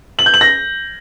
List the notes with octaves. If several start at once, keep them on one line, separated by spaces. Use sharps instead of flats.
F#7
G6
F#7
A#6